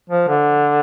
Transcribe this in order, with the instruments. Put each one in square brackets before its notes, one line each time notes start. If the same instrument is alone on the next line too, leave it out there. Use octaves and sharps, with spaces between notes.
[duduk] F3
D3